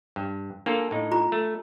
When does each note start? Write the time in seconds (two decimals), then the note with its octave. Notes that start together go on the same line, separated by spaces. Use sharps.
0.16 G2
0.66 A#3 D4 F4 A4
0.91 A2 D#4
1.11 F4 A#5 B5
1.32 A3